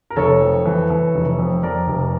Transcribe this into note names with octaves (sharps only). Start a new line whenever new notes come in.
A#4
F1 A4 C#5
F2
E3
E3
F1
F2
F2 A#4 D5
F1